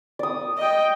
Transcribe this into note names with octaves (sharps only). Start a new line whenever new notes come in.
D5 D#6
D#5 G5